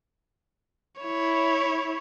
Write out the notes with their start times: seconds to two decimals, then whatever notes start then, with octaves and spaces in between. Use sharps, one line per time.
1.01 E4 C#5